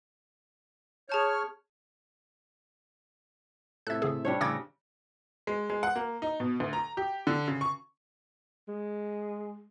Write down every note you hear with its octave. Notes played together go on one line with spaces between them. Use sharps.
G#4 C#5 A5 F6 G6
A2 C3 A4 E5 F#6 G#6
C#3 G#4
G3 D4 C#5
A2 C#3 E3 D6 E6 G#6 A#6
G#3
G#3
F#5
A#3
D#4
B2
D2
A#5
G4
D3
C#3
C#6
G#3